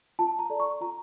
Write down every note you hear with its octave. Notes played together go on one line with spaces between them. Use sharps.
F4 A5
A#5
A4 D5
C#6
F4 A#5